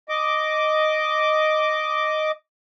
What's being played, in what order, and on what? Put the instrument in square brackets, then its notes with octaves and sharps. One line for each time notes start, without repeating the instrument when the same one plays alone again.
[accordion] D#5 D6